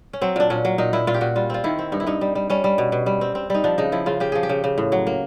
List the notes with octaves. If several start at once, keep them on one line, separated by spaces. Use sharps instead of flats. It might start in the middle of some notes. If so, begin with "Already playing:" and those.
C#4
F#3 C4
A#2 D4
A#2 C#4
F#3
A#2 D#4
A#2 E4
A#2 F4
G4
A#2 F#4
G3 F4
C4 F4
D#3 E4
C4
G2 D#4
E4
G2 D#4
G3
G3
G3 C#4
G3
B2
B2
G3
C4
C4
G3 D#4
F3 D4
C#3 D#4
F3 E4
C#3 F4
C#3 G4
F3 G#4
G4
C#3
C#3
A2
F#3
A#3